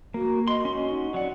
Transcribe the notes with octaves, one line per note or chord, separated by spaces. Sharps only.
A#3 F#4
D#5 C6
C#4 F#4
D#4
F#3 D5 F#5